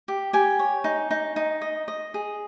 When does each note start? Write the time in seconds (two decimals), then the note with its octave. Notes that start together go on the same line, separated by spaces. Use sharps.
0.08 G4
0.33 G4 G#5
0.59 C#5
0.84 D#4
1.11 D#4
1.36 D#4
1.61 D#5
1.88 D#5
2.14 G#4